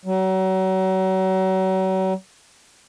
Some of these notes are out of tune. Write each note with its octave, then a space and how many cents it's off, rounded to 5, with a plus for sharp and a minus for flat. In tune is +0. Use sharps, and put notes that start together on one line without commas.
F#3 +35